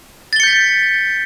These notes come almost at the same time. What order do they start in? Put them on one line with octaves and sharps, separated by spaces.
A6 G7 C#7 G6 B6